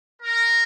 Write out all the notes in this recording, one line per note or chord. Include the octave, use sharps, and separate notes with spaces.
A#4